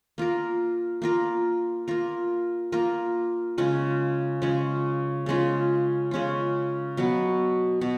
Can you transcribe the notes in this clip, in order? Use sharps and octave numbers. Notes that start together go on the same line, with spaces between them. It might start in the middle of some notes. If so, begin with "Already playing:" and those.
A#3 F4 A#4
A#3 F4 A#4
A#3 F4 A#4
A#3 F4 A#4
C#3 G#3 C#4 F4
C#3 G#3 C#4 F4
C#3 G#3 C#4 F4
C#3 G#3 C#4 F4
B2 F#3 B3
B2